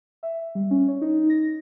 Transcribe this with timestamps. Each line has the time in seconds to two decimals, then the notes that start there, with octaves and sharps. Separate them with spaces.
0.23 E5
0.55 G3
0.71 C#4
0.88 C#5
1.02 D#4
1.30 A#6